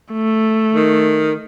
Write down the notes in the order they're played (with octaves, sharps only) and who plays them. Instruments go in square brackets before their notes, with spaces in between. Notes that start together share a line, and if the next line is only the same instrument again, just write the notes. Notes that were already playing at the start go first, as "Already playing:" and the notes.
[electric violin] A3
[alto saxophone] D#3